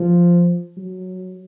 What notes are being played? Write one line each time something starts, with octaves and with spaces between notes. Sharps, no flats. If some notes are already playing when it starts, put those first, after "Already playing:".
Already playing: F3
F#3